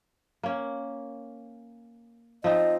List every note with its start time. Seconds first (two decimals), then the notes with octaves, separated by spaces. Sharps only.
0.43 A#3 C#4
2.44 F3 C4 D#4 D#5